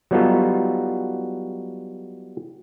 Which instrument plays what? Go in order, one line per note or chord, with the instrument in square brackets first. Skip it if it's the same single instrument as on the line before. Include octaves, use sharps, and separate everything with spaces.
[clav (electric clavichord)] F#3 G3 B3 D#4 F4 A4